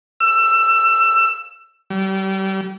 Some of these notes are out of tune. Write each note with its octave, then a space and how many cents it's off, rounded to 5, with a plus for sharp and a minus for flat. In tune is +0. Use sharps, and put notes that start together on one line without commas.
E6 +20
G3 -30